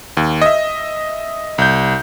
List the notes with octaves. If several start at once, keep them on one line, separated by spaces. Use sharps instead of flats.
D#2
D#5 E5
C2 G6